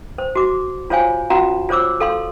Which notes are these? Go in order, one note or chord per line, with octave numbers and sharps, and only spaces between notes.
C5
F#4 D6
F4 C5 C#5 F5 G#5
C#4 F4 F#4 F5 A#5
F4 C5 C#5 D6 E6
A4 F5 C6